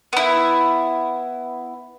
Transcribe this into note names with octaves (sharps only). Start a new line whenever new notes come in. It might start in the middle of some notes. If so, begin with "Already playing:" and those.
B3 E4